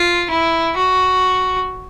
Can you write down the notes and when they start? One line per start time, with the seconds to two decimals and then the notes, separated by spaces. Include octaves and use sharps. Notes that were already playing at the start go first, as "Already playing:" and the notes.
Already playing: F4
0.30 E4
0.76 F#4